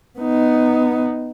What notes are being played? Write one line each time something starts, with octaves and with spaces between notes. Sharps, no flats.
B3 D#4